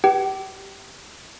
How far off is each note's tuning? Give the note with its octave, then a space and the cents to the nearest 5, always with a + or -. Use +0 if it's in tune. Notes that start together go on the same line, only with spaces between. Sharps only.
G4 +0 B4 -20 G5 -40